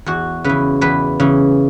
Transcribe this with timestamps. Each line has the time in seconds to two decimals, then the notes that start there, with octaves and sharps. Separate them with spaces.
0.06 E2 F#4
0.44 C#3 E3 B4
0.81 E2 B4
1.20 C#3 E3